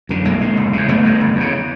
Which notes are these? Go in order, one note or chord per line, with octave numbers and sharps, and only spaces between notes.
F#2 D3
B1 G#3 A#3
A2
F#1
E2 C#3
G1 A3 B3
G2 D3
F#1
E2 C#3